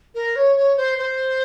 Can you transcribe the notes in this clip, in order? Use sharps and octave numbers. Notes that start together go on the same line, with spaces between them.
A#4
C#5
C#5
C5
C5